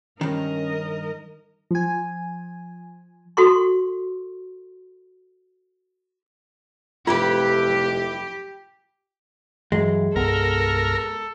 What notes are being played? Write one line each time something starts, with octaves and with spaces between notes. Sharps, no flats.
G2 D#3 C#4 A#4 D#5
F3 G#5
F#4 A4 C6 C#6
F1 E4 F4 G4 A4 B4
G2 E3 F#3 G#3
C2 G2 B3 A4 A#4